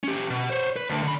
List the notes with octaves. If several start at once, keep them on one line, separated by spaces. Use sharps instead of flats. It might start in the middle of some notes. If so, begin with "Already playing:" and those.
C#4 G4
B2
C5 C#5
B4
D2 D3
D3 B5